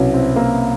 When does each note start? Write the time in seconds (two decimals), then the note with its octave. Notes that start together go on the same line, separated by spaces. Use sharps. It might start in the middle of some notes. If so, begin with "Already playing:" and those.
Already playing: C2 B2 F#3 C#4 E4
0.14 C4
0.36 A#3